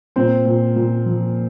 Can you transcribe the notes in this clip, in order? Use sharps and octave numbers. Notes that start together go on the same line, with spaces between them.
A#2 C4 C5
A#2
A#2
F3